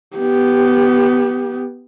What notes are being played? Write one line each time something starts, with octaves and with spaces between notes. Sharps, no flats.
B3 G4